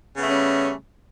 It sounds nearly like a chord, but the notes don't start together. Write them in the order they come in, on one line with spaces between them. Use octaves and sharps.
C#3 B3 A3 G3 C#4